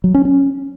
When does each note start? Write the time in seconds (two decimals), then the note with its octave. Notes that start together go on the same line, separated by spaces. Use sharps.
0.04 F#3
0.14 C#4
0.25 C#4